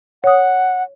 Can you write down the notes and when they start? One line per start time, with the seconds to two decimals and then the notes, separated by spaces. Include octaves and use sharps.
0.24 C#5 F#5 D#6